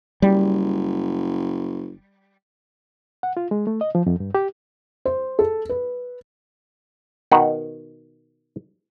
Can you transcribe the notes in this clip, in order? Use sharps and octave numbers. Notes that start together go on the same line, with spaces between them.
F#1 G3
F#5
F4
G#3
A3
D#5
F3
F2
G2
G4
C5
A4
B4
B2 D#3 F#5